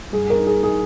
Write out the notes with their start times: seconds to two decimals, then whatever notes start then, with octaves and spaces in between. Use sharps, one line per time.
0.12 G2 G#4
0.30 A#4
0.35 D#4
0.47 G#4
0.57 D#4
0.63 G#4